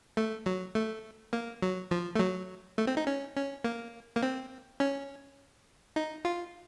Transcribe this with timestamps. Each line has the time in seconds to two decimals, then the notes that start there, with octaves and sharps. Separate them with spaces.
0.17 A3
0.46 F#3
0.75 A3
1.33 A#3
1.62 F#3
1.91 F3
2.16 A3
2.19 F#3
2.78 A3
2.87 C4
2.97 D#4
3.07 C#4
3.36 C#4
3.64 A#3
4.16 A#3
4.23 C4
4.80 C#4
5.96 D#4
6.25 F4